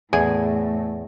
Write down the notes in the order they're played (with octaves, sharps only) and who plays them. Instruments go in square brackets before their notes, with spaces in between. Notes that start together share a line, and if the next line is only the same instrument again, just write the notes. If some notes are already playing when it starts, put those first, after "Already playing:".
[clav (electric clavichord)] E2 [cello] A2 [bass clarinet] A3 [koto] G#4